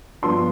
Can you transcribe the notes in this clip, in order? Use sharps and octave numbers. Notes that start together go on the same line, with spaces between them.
G2 F3 B3 D4 C6